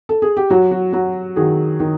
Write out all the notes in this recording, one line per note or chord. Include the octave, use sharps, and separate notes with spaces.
A4
G#4
G4
F#3 F#4
F#4
F#3 F#4
D#3 F#4 G#4
D#3